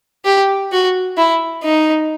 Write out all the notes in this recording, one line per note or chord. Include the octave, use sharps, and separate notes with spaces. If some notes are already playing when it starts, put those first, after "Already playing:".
G4
F#4
E4
D#4